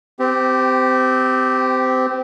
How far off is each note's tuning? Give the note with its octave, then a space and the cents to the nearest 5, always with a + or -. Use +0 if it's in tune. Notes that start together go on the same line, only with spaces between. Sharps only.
C4 -25 G4 +0